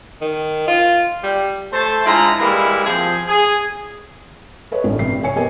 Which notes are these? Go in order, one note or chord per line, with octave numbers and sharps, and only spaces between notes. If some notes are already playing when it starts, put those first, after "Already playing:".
D#3
F4
G3
A3 C5 A5
D3 G#3 E4 F4 A#5
E3 G3 G#3 A#3 E4 G#4
F3 C4 G#4
G#4
A4 B4 C#5 D#5
A1 G2
G2 C3 C7
C#5 G#5 C#7
B3 G4 A#4 D#5 G#5